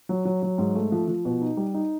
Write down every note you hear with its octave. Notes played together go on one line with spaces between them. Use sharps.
F#3
F#3
F#3
G#2
A3
F3
F3
B2
D#4
G3
D#4